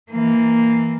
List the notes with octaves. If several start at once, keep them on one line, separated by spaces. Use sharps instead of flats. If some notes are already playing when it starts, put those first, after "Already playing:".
E3 A#3